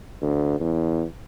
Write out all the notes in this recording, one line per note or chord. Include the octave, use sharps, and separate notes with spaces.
D2
E2